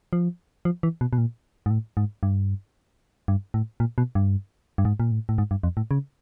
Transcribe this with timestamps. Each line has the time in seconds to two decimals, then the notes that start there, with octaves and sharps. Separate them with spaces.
0.13 F3
0.65 F3
0.83 E3
1.01 B2
1.13 B2
1.18 A#2
1.66 G#2
1.70 A2
1.97 G#2
2.23 G2
3.28 G2
3.54 A2
3.80 A#2
3.98 B2
4.15 G2
4.78 G2
4.85 G#2
5.00 A#2
5.11 A2
5.29 A2
5.38 G#2
5.51 G2
5.63 F2
5.77 A2
5.91 C#3